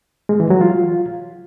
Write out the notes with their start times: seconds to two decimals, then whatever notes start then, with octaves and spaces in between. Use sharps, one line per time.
0.29 G#3
0.40 E3
0.50 F#3
0.61 F4